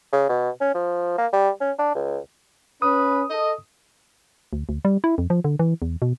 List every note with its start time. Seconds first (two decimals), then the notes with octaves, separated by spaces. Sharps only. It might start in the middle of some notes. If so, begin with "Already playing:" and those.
0.13 C#3
0.29 B2
0.61 C#4
0.75 F3
1.18 A#3
1.33 G3
1.61 C#4
1.79 D4
1.95 C#2
2.82 C#4 B4 D#6
3.31 A4 D#5
4.53 D2
4.69 D2
4.85 G3
5.04 E4
5.18 F2
5.30 F3
5.44 D3
5.59 E3
5.82 E2
6.02 B2